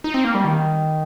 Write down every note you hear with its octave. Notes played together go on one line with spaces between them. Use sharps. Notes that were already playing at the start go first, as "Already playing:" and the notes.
D#4
C4
A#3
G3
D#3